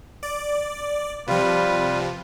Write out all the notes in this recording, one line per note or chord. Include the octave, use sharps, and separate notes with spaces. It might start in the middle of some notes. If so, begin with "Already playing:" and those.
D5
C3 F3 G3 F4 B4